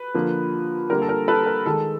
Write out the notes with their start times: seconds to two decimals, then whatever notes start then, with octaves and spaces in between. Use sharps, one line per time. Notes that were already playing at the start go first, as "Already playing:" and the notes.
Already playing: B4
0.15 D3 F3 A#3
0.90 D3 G3 A#3 A#4
1.02 A4
1.09 A#4
1.28 A4 B4
1.46 A#4
1.66 D#3 G#3 A4